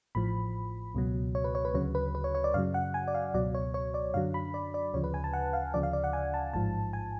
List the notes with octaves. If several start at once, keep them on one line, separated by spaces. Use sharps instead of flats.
A1 A2 F3 B5
C#2 B2 F#3
C#5
B4
C#5
B4
D2 C#3 F#3 C#5
B4
B4
C#5
C#5
D5
F#2 C#3 F#3 F5
F#5
G#5
D5
F5
C#2 B2 F#3 D5
C#5
C#5
D5
F#2 D3 F#3 F5
B5
D5
D5
D2 C#3 F3 C#5
B4
G#5
A5
F#5
F5
D2 C#3 F3 D5
F5
D5
F#5
G#5
A5
A1 G#2 F3 A5
G#5